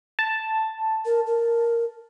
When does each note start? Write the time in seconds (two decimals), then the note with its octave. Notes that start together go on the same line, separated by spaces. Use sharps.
0.19 A5
1.05 A#4
1.27 A#4